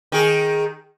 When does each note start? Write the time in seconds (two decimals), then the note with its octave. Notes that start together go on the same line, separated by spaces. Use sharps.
0.12 D#3 G#4